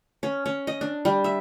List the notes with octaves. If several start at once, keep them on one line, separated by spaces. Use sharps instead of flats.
C#4
C#4
D#5
D4
G3
E5